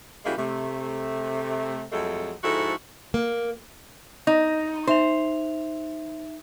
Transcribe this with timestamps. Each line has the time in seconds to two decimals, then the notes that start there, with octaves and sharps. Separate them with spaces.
0.25 C#3 G3 G#3 A#3 E4 F#4
0.37 C3 A3
1.92 F2 F#3 G#3 A3 A4
2.43 G#2 F3 E4 F#4 A4
3.14 A#3
4.27 D#4 A#6
4.87 D#4 C5 E5 F7